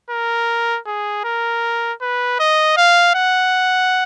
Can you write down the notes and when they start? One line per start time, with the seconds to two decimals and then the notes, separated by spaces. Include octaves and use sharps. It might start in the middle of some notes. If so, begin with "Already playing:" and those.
0.11 A#4
0.87 G#4
1.24 A#4
2.01 B4
2.40 D#5
2.77 F5
3.15 F#5